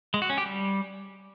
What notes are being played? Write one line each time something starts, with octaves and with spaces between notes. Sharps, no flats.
G#3
F#4
C#4
G4
G3